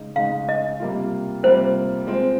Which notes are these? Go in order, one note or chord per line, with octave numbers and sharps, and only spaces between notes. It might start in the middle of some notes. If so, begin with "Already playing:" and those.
Already playing: C#3 G#3 D#4
C#3 G#3 D#4 F5
D#5
C3 G3 A#3 F4
C3 G3 A#3 F4 C5
G#3 C4 F4